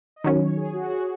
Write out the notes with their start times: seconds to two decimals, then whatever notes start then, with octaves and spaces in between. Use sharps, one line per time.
0.16 D#5
0.24 D#3 F#3 C#4 C#5
0.40 C#5
0.57 G#4
0.73 F#4
0.90 F#4